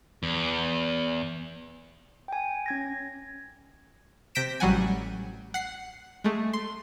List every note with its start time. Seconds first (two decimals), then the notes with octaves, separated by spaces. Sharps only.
0.23 E2
2.28 G5 G#5
2.66 C#4 G#6 A#6
4.35 C3 G6 A#6 B6 D7 E7
4.60 A1 F#3 G3 F#5 G#5
5.54 F#5 C7
6.24 G#3 A3
6.53 C6